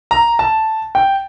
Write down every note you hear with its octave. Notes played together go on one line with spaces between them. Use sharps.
A#5
A5
G5